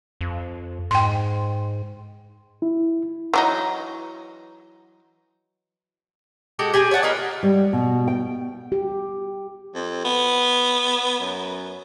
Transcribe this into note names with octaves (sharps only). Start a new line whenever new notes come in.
F2
G#2 G5 C6
E4
E3 F#3 D#4
G#3 F#4 G4 A4
G4 G#4 G#5
C#5 D5 F#5 A5
F4 A#4 B4 D#5
G3
B2
G5
G4
F2
B3
F#2